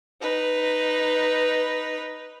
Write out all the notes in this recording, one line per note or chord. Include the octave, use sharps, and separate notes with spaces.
D#4 B4